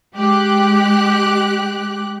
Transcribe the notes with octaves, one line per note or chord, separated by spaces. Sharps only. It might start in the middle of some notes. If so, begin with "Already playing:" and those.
G#3 G4 F#6